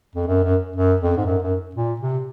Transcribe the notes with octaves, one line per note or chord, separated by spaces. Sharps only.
F2
F#2
F#2
F#2
F2
G#2
F#2
F#2
A#2
C3